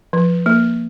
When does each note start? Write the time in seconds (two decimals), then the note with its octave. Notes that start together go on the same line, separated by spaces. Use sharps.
0.13 F3
0.46 A#3